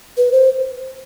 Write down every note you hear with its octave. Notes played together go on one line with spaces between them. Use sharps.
B4
C5